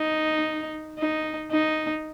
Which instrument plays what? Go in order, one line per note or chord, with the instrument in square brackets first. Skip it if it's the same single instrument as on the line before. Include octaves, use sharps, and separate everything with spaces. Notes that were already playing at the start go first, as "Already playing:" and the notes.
Already playing: [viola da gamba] D#4
D#4
D#4